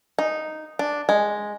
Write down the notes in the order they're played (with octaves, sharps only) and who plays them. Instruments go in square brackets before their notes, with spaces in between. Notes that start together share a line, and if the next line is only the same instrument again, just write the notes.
[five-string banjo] D#4
D4
G#3